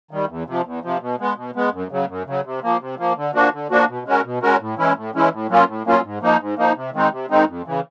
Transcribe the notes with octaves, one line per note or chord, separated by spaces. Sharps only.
D#3 G3
E2
C3 F3
E2
C3 F3
B2
G#3 B3
B2
G#3 B3
F#2
C#3 F#3
F#2
C#3 F#3
C3
F3 A#3
C3
F3 A#3
D3
F3 A#3 D4 F#4
D3
F3 A#3 D4 F#4
B2
G#3 C#4 F#4 A#4
B2
G#3 C#4 F#4 A#4
A2
E3 G#3 C#4 E4
A2
E3 G#3 C#4 E4
A2
F#3 A#3 C#4 F4
A2
F#3 A#3 C#4 F4
G#2
F3 A#3 D#4
G#2
F3 A#3 D#4
C3
D#3 G#3 C4 D#4
C3
D#3 G#3 C4 D#4
F2
C#3 E3